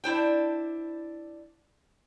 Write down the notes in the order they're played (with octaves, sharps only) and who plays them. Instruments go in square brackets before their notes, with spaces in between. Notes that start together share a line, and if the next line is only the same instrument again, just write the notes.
[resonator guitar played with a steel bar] D4 E4 C5 G5